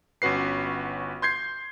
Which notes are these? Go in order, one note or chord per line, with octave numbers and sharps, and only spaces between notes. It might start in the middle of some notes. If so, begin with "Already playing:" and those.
G1 C#4 F#4 B4 C7
C6 G6 G#6 C7